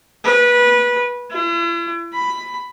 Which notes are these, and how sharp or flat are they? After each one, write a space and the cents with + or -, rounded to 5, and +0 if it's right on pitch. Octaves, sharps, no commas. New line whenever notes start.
B4 -20
E4 +45
B5 +10